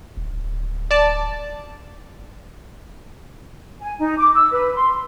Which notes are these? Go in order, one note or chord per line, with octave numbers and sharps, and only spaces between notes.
D1
D5 A5
G#5
D#4
D6
E6
B4
C6